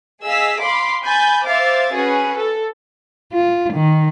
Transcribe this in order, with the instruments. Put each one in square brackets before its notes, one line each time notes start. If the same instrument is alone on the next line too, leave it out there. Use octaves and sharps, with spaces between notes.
[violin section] G#4 D#5 F5 E6 B6
F5 B5 C6 D6
G#5 B5 G6 A6
C5 E5 F5 D6 A6
C#4 F#4 G#4 B4
A4
[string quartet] F4
D#3